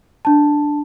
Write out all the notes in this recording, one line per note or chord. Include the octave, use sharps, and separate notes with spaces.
D4 A5